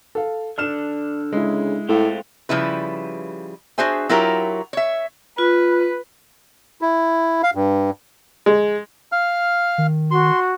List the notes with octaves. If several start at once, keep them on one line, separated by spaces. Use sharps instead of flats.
A4 F5
D3 D4 F6 E7
C#3 G#3 E4
A2 A3 C4 F4
C#3 F3 G3 E4 B4
D4 F#4 G#4 C5 E5 G#5
F#3 E4 F4 G4 A#4 C#5
C#5 E5
F4 B4
E4
F5
G2
G#3
F5 F6
D#3
F#4 C6